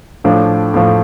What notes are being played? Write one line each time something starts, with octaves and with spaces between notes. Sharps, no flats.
A2 F3 D4
A2 F3